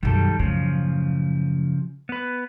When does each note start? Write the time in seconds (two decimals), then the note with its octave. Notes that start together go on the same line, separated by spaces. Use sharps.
0.03 B1 F#2 D#3 G3 A4
0.39 F#2 A2 C#3 F3
2.09 B3 B4